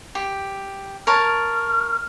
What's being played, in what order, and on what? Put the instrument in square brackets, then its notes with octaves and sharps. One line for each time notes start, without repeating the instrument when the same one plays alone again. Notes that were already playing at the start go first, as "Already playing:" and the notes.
[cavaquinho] G4
[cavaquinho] A#4 C#5 A5 [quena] F6